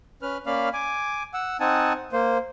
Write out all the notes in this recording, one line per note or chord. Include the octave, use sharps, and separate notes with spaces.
C#4 B4 F6
A#3 C#4 D5 F5 B5 F6
G#5 D6
F#5 E6
C4 D#4 F#5 G#5 A5
A#3 C5